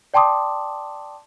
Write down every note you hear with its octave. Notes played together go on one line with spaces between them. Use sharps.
D5 G5 A5 C6 D6 D#6